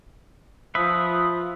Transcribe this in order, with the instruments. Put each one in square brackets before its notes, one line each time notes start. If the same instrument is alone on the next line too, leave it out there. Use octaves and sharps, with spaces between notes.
[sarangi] F3 [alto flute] F4 [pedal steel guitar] B4 E5 [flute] D#6